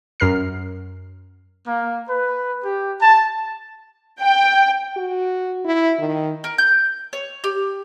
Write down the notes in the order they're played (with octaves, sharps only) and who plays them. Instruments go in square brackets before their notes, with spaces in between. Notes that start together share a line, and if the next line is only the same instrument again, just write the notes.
[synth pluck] F#2 A#4 F6 C7
[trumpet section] A#3
B4
G4
A5
[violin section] G5
[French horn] F#4
E4
D#3
[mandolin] A#4
G6
C#5
G4